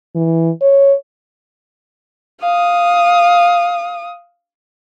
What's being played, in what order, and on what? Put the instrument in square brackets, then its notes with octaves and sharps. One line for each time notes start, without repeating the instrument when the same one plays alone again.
[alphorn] E3
C#5
[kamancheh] F5 D#6